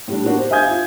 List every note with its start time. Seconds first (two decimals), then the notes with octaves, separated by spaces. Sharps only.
0.08 A2 G3 D4
0.25 A#3 B3 D4 F#4
0.37 G4 C5
0.51 E5 F5 G#5 D#6 G6 G#6
0.68 D4 F4